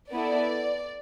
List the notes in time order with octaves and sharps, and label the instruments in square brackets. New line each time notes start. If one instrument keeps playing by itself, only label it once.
[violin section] B3 E4 A4 D5